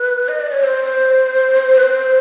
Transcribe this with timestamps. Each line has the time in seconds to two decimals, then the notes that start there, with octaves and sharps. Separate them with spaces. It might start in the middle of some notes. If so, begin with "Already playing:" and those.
Already playing: B4
0.28 D#5
0.40 D5
0.52 C#5
0.63 C5
1.78 B4
1.83 C5